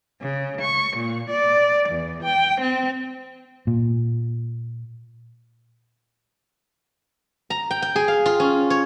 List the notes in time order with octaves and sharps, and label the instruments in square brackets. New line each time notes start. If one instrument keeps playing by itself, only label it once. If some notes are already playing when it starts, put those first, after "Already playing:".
[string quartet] C#3
C#6
A#2
D5
E2
G5
C4
[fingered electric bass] A#2
[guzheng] A#5
G5
G5
G#4
F5
F4
C#4
C#5